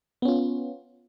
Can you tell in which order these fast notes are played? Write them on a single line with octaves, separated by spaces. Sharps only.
B3 C#4 F4